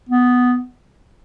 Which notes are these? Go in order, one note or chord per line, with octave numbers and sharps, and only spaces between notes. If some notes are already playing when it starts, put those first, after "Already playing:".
B3